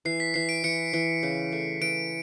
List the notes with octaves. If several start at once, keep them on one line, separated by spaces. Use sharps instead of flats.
E3 C7
B6
E3 C7
D7
E3 C#7
E3
C#3
A3
E3 D7